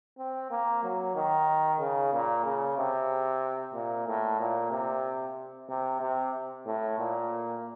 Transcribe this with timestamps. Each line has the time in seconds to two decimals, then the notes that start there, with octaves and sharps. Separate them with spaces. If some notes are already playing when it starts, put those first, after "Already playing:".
0.18 C4
0.51 A#3
0.84 F#3
1.16 D#3
1.80 C#3
2.13 A#2
2.45 C#3
2.78 C3
3.74 A#2
4.07 A2
4.39 A#2
4.71 C3
5.69 C3
6.01 C3
6.66 A2
6.98 A#2